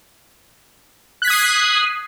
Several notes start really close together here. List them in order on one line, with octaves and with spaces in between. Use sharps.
F#6 B6 G#6 D#6 C7